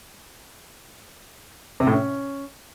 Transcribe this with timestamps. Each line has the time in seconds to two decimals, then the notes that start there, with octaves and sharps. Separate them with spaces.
1.80 C3
1.87 A2
1.93 C#4